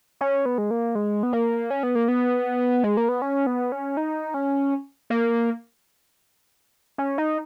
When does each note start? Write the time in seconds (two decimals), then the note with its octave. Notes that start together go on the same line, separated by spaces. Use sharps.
0.21 C#4
0.46 B3
0.58 G#3
0.71 A#3
0.95 G#3
1.23 B3
1.33 A#3
1.71 C#4
1.83 B3
1.95 A#3
2.08 B3
2.84 G#3
2.97 A#3
3.09 B3
3.22 C#4
3.47 B3
3.72 C#4
3.97 D#4
4.34 C#4
5.10 A#3
6.98 C#4
7.18 D#4